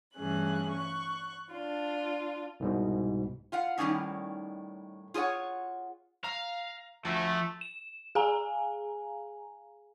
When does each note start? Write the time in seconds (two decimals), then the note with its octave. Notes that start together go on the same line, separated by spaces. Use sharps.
0.16 G2 E3 A3 C#4 G#4 F#6
0.71 C#6 F#6
1.51 D4 F4
2.60 C2 G#2 B2
3.52 F4 F5 F#5
3.78 A2 D#3 F3 G3 C#4 D#4
5.14 F4 G#4 A4 C#5 F#5
6.24 F5 A#5
7.05 D2 F3 A3
7.61 E7
8.15 G#4 F5 G#5 A#5